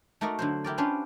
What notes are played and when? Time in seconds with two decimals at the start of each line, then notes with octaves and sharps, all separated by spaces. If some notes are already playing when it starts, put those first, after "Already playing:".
0.21 A3 D#4 F#4 A#4 D5 D#5
0.39 D3 F#3 C5
0.64 E4 G4 A#4 D5
0.78 C#4 D4 F4 B4 C5